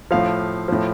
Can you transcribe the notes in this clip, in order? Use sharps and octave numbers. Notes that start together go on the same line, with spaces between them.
A2 F3 F5
A2 F3